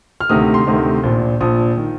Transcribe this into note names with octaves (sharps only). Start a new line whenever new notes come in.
F6
D2 C3 D#3 D#6
C6
D2 C3 D#3
A#1 A#2
A#1 A#2 D#6
D#3